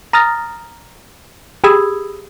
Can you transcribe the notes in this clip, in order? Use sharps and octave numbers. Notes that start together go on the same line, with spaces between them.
A#5 D#6 F6 A6 A#6
G4 G#4 B5 D#6 E6 G#6